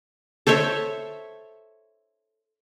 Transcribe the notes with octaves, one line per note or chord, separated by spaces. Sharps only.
A4 C5 C#5 E5